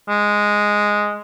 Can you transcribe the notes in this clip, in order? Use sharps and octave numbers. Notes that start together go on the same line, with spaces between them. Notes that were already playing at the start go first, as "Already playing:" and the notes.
G#3